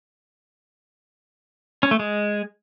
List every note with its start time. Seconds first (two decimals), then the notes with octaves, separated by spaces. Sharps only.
1.83 C#4
1.91 A3
1.99 G#3